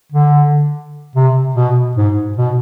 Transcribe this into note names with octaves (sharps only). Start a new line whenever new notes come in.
D3
C3
B2
G#2
B2